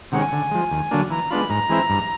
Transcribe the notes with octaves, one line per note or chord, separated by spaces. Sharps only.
C3 D#3 G#3 C#4 F#5
G#5
D3
F3 G#3
D#2
D3 F#3 A#3 D4
E3 A#5
G#3 B3 D4 F4 B5
G#2 A#5
E3 G#3 C4 E4
G2